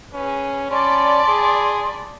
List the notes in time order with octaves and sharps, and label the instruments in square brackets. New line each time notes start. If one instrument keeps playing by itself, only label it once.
[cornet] C#4 [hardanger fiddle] G#4 B4
[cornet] C#4 [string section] D5 B5 [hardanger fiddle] A5 D6 [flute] C6
[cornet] G#4